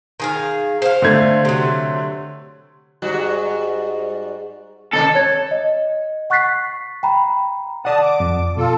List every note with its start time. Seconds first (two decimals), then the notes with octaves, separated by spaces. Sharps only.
0.20 D#3 G#4 F5
0.82 C5 F5
1.02 D3 A3 G#6
1.45 C3 F#3
3.02 G#2 G3 F#4
4.93 D#2 C3 A#3 A4
5.15 C#5 G#6 A6
5.51 D#5
6.30 F#5 C#6 F#6 A6 B6 C7
7.03 G5 A#5 B5
7.85 D5 F#5 A5 D#6
8.03 D6
8.20 F2
8.57 B2 F4 A4